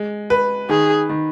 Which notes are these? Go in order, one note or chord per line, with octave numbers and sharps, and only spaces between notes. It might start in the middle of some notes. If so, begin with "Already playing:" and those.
Already playing: G#3
B4
D#3 G#4
D#3